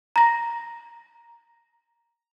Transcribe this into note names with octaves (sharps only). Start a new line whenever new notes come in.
A#5 A#6